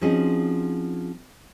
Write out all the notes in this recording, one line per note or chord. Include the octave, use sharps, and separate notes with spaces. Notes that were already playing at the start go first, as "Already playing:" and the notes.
F3 C4 C#4 D#4 F#4 G#4